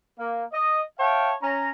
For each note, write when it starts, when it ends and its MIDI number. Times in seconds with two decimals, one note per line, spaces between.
0.19 0.44 58
0.53 0.81 75
0.99 1.33 73
0.99 1.33 76
0.99 1.33 77
0.99 1.33 79
0.99 1.33 81
1.42 1.72 61
1.42 1.72 82